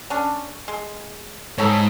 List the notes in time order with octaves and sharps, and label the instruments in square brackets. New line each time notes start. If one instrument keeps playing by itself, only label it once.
[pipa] C#4 D4
G#3
[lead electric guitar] G#2 [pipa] A4 C#5